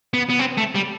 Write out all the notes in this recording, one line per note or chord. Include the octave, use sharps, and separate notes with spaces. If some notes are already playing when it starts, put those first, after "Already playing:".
B3
B3
C4
A3
G3